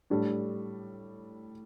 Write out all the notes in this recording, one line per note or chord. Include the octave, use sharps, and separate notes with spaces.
A2 G3 D4 A4